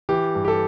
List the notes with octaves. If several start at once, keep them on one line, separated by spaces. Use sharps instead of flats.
E3 G4
G2
G4
A4